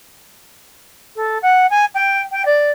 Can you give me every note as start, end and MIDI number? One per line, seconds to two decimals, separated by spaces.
1.15 1.38 69
1.42 1.66 78
1.70 1.85 80
1.94 2.21 79
2.31 2.45 79
2.45 2.71 74